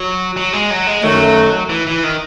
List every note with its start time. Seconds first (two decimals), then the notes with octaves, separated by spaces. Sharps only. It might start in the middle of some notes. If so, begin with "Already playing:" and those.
Already playing: F#3
0.37 F#3
0.53 G#3
0.70 F#3
0.87 G#3
1.03 F#2 D#3 F#3 A3
1.69 E3
1.87 E3
2.04 D#3